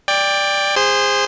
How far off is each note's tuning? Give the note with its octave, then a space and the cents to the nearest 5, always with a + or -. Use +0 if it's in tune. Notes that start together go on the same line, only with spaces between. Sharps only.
D5 +0 G5 +20
G#4 -25 C5 +0 C6 +0